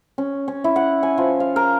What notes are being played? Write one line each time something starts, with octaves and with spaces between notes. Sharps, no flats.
C#4
C#4
E4
F#5
G#5
F3
F5
A#4